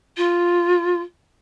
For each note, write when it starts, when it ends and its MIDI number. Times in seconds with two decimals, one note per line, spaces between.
0.17 1.01 65